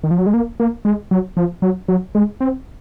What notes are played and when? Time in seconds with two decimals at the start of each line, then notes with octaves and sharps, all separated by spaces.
0.04 D#3
0.11 F3
0.18 F#3
0.26 G#3
0.34 A#3
0.60 A#3
0.85 G#3
1.11 F#3
1.37 F3
1.62 F#3
1.88 F#3
2.15 G#3
2.40 C4